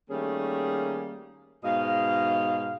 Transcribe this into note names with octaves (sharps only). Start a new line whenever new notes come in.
D#3 G3 A3 A#3 C#4 G#4
G#2 B2 D#5 F5